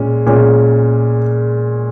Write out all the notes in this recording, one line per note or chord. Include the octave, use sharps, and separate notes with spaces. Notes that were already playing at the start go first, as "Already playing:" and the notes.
Already playing: A#2 G#3 C#4
A#2 G#3 C#4